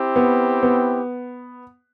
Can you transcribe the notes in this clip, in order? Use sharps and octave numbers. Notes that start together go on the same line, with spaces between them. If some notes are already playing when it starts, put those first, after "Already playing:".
Already playing: C4 E4 G4
B3
B3